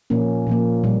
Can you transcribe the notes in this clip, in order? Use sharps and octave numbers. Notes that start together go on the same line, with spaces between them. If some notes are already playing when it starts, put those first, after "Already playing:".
A#2 F3 A#3 C#4
A#2 F3 A#3
A#2 G3 A#3